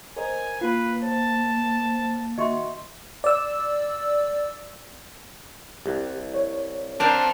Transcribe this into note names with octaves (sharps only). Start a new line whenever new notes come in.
A#4 C5 D#5 G#5
A#3 F4 B4 B5
C5 A5
D#3 F#4 D#5 E5 C6 C#6
D5 E6
C2 G4
C#5
C4 D4 F4 A4 A#4